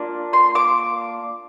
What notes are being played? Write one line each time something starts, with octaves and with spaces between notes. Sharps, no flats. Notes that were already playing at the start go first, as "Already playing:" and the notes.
Already playing: A#3 D4 F4
C6
D6